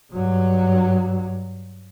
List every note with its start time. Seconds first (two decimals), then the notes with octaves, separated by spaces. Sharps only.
0.11 G2 F#3